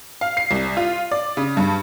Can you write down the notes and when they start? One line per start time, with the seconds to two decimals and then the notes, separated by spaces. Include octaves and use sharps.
0.21 F5
0.37 C7
0.51 C2
0.77 F4
1.12 D5
1.37 C#3
1.57 G2